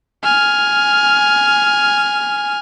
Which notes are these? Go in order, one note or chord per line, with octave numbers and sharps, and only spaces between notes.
G#5 F6